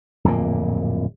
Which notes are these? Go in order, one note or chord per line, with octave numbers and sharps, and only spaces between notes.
D1 F2 A#2 A#3